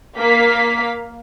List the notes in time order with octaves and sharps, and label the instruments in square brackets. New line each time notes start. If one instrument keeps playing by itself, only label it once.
[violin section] A#3 F5 B6